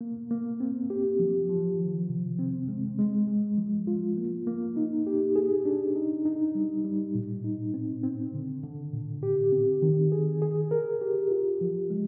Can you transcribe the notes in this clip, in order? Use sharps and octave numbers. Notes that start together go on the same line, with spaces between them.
A#3
A#3
C4
G4
F3
F3
D#3
C3
C4
G#3
G#3
G#3
F3
F4
A#3
A#3
D#4
G4
G#4
D4
D#4
D#4
G3
G3
A#2
D#4
C4
C4
D3
D3
A#2
G4
C4
D#3
G#4
G#4
A#4
G4
F4
F3
G#3